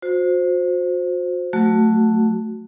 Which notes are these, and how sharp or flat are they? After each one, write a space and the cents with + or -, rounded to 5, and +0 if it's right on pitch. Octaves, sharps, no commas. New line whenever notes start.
F#4 -40 C5 +0
F#3 -10 A3 +5 F#4 +0